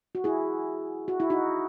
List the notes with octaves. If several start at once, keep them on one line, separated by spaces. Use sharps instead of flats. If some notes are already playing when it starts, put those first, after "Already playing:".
F#4
E4 G#4
F#4
E4
D#4 F#4